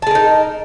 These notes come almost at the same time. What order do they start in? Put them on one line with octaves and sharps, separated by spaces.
A5 G#4 A#4 D#4